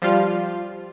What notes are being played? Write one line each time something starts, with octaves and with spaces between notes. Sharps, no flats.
F3 G3 F4